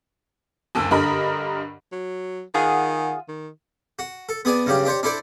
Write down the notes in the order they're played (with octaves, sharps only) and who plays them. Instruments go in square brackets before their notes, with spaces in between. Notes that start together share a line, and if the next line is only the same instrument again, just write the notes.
[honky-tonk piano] F#1 D2 A5 E6
G2 D3 A#4 D#5 B5
[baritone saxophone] F#3
[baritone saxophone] D#3 [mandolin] F4 G#4 F#5
[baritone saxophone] D#3
[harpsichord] F#4
A4
B3 G#4 D5 G#5
G2 C#3 F#3 G4
D4 G4 C5 C#5
D4 E4 A4 C5 D5